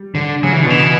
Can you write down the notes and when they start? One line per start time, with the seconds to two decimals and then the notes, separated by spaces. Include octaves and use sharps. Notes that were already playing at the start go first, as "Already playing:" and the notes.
Already playing: G3
0.15 D3
0.43 C#3 F#3
0.52 E3
0.61 B2 D3
0.70 E3